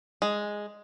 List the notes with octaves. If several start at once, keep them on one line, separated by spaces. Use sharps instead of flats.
G#3